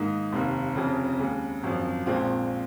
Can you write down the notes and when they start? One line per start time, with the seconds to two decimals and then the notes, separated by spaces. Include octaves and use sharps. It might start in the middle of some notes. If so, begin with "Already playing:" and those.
Already playing: G#2 D#3 A#3 D#4
0.33 F1 D#2 D#3 A#3
0.76 F1 F2 C#3
1.19 D#2 C#3 G#3
1.63 G#1 F#2 F3
2.06 A#1 A#2 G#3 C4 F4